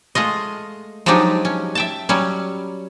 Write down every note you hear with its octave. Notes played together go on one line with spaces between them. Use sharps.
G#3 A3 F4 D#5
F3 F#3 G#3 D4 D#4 G4
C#4
E5 G5 A5
F#3 G3 C#4